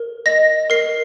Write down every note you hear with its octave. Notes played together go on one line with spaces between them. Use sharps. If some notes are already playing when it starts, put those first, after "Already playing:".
Already playing: A#4
D#5 A#6
A#4 C7